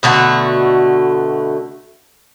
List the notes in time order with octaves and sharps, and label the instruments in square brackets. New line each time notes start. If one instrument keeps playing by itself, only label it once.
[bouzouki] B2 D3 A3 F#4